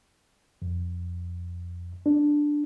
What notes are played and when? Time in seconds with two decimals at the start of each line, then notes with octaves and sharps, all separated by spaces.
0.62 F2
2.06 D4